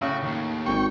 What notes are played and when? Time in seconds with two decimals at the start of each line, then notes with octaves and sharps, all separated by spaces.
0.02 A2 C#3 F#4
0.23 D#2
0.66 G#1 G5 C#6